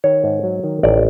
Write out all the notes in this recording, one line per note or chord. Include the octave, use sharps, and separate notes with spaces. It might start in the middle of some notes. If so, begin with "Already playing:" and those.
D#3 C#5
G#2
F#3
D#3
A1 D5